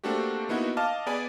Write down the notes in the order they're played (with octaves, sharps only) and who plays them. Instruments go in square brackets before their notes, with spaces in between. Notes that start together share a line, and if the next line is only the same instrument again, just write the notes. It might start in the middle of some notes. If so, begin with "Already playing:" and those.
[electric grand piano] A3 A#3 C4 D4 F#4 G4
A#3 B3 D#4 E4 F#4
D#5 F5 A5 D6 F6
B3 G#4 D5 G#5 B5